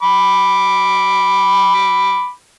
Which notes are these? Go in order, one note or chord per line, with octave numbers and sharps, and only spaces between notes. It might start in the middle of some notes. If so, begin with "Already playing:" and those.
B5 D6